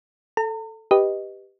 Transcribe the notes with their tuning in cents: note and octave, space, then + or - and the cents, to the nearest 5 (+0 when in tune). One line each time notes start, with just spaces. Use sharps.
A4 +0 A#5 -45
G4 +0 B4 -5 D#5 +0